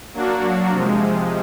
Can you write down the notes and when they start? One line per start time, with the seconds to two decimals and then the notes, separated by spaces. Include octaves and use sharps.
0.14 F#3 A#3 D4 F#4
0.72 C3 F3 G#3